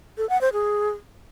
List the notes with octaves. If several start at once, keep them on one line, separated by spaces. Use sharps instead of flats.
A4
F#5
C5
G#4